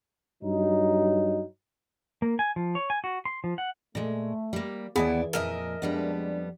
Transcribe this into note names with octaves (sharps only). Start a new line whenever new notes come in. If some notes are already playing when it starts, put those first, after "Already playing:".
G2 F#3 D#4
A#3
G#5
F3
C#5
G#5
F#4
C6
F3
F#5
A#2 G#3 A3
G3 A#3
D#2 E3 B3 E4 G#4 D5
F2 A#2 A#4 D#5 E5 G#5
F2 G3 G#3 B3 D4